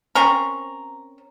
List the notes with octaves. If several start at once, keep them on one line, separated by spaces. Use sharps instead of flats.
C4 C#4 A#4